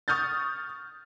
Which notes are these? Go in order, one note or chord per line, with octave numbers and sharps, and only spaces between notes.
C#6 D#6 F6 G6 A6